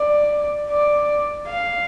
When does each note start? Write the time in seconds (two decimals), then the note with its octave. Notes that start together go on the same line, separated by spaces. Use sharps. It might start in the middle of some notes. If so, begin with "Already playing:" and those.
Already playing: D5
0.70 D5
1.47 F5